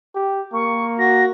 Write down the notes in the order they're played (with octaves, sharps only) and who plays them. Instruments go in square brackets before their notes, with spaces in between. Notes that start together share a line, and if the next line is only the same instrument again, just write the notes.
[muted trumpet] G4
[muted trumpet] A#3 [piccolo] C#6
[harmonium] F#4 [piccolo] A#6